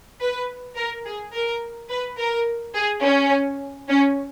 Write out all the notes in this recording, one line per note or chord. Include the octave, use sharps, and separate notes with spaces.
B4
A#4
G#4
A#4
B4
A#4
G#4
C#4
C#4